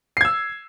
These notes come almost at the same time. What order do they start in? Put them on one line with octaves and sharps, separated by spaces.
C7 G#6 E6